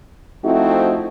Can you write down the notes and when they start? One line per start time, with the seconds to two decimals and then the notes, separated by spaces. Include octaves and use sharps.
0.44 F3 A3 C4 D#4 E4 F#4